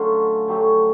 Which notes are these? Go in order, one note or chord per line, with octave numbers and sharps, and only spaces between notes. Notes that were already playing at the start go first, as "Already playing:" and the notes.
Already playing: D3 F#3 A3 C#4 F4
D3 F#3 A3 C#4 G4